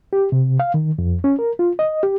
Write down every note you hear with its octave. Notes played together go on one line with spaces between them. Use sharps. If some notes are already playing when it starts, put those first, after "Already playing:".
G4
C3
F5
D#3
F2
C#4
A#4
F4
D#5
G4